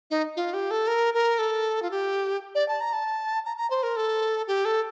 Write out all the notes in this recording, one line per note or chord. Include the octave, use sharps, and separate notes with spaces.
D#4
F4
G4
A4
A#4
A#4
A4
F4
G4
D5
A5
A#5
A5
A#5
A#5
C5
A#4
A4
G4
A4